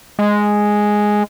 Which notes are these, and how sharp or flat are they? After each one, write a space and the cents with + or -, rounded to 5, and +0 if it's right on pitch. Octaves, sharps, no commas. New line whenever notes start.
G#3 +0